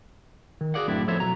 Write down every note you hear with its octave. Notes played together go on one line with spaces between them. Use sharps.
D#3
F#4 G#4 C5 D5 F5 F#5
F#2 A2 C4 D4 E4
F3 B3 A4 C5 C#5 E5
B1 F#3 A#5